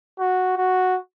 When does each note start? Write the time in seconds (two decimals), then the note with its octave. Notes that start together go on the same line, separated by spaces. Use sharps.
0.19 F#4
0.57 F#4